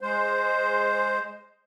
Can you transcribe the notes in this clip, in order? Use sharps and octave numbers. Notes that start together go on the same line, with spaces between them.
G#3 C5